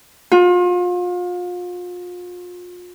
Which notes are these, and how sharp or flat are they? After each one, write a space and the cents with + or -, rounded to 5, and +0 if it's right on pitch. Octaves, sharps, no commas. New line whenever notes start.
F4 +35